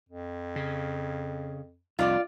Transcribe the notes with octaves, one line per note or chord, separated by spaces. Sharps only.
F2
C#3
C2 F2 F4 D5